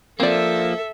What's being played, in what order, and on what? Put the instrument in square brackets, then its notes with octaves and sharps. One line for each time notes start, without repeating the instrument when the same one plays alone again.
[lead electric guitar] F3 A#3 [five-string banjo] C4 D5 [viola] A4 E5